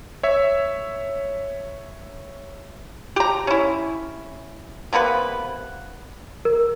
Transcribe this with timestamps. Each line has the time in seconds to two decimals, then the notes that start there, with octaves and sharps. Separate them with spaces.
0.23 C#5 E5
3.16 G4 A#5
3.47 C#4 E4
4.93 C3 A#3 B3 B4
6.45 A#4